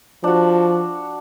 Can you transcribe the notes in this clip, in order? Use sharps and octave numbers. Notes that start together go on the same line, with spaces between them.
F3 D4 F#4